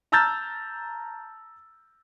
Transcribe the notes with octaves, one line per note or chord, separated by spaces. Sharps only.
A5 A#5 E6 F6 G6 A6